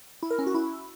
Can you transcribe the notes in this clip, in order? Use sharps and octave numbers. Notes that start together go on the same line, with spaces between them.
E4
A#4
C#4
F#4
E4